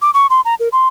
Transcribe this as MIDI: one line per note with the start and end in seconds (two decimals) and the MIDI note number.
0.02 0.11 86
0.14 0.27 85
0.30 0.41 84
0.45 0.55 82
0.60 0.69 70
0.72 0.88 84